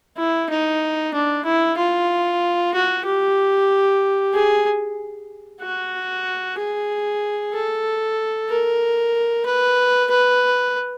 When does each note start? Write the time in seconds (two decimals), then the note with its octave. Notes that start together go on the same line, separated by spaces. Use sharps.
0.17 E4
0.50 D#4
1.14 D4
1.45 E4
1.78 F4
2.74 F#4
3.05 G4
4.34 G#4
5.62 F#4
6.58 G#4
7.54 A4
8.50 A#4
9.46 B4
10.10 B4